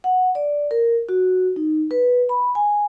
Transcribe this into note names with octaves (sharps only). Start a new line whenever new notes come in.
F#5
D5
A#4
F#4
D#4
B4
B5
G#5